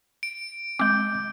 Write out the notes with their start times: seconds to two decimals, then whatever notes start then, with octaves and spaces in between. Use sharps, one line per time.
0.23 D7
0.79 G#3 C4 D6 G6